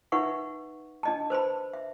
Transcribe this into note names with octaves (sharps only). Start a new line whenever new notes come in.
D#4 B4 E5 F#5 C#6
D4 D#5 A5
B4 C5 A5 B5
E5